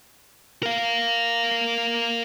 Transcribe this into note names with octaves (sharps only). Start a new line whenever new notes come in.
A#4 F5